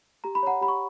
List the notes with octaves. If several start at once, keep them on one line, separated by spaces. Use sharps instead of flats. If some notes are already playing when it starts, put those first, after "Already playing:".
G4 A#5
B5
C#5 F#5 A#5
G4 B5
C#6